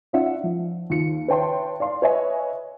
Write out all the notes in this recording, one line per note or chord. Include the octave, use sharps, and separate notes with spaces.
C#4 D#4 F4 D5 E5 F#5
F3
D#2 F4 C#7
B4 C#5 E5 G5 A5 C6
D5 F5 C6
B4 C#5 D#5 E5 G#5